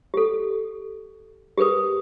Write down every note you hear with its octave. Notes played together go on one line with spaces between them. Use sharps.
G4 A4
G4 G#4 A#4 B4 D#6